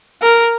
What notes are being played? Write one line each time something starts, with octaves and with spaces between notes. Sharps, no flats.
A#4